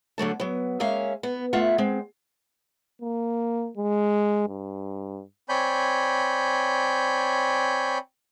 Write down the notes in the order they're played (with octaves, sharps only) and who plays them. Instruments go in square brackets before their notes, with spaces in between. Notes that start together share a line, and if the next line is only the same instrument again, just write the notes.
[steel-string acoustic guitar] D3 F#3 A3 A5
F#3 B3
G#3 A#3 C#4 E5 F5
B3
A3 F4 E5 F#5
G#3 C4
[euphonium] A#3
G#3
G2
[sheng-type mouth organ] C4 C#5 D5 G#5 B5 G6